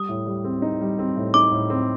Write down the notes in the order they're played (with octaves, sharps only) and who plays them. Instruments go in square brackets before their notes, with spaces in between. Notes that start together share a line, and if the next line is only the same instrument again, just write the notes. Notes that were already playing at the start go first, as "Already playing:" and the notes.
Already playing: [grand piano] G3 [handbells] D#6
[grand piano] A2
G3
C4
D#4
G3
C4
A2
[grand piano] D#4 [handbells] D6
[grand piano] A2
C4